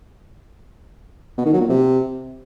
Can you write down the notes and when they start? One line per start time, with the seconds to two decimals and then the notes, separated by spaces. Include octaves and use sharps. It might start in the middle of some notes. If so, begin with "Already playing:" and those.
1.37 B2
1.45 D#3
1.53 F#3
1.61 A#2
1.69 C3